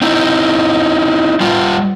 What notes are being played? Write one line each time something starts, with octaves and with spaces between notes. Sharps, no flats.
C4 D#4 E4
G3 F4